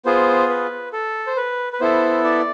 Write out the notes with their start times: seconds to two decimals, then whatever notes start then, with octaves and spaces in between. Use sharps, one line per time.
0.05 B3 F4 G#4 C5
0.49 B4
0.93 A4
1.27 C5
1.37 B4
1.73 B4
1.80 B3 E4 A4 C5
2.24 D5